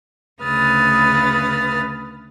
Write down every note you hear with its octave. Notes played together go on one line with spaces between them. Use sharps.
D2 C#3 B4 D#6 F6 A6